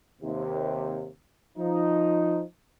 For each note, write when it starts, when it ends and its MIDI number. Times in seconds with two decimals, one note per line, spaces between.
0.21 1.07 39
0.21 1.07 48
1.57 2.41 53
1.57 2.41 63